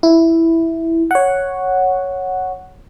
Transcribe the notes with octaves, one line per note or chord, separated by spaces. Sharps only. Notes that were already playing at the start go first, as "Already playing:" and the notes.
E4
C#5 F#5